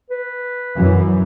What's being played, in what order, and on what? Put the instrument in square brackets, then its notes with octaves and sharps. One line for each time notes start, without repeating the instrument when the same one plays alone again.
[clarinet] B4
[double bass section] F#2 E3